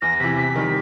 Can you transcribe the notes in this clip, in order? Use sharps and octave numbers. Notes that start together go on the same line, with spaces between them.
E2 A#6
C3 E3 B6
C3 B6
D#3 G3